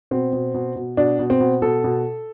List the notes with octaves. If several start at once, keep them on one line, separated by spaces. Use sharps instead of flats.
B2 C4
B2
B2
B2
B2 D4
B2
C4
B2
B2 A4
B2